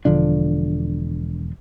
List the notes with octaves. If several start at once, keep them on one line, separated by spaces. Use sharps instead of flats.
E1 D3 F3 D4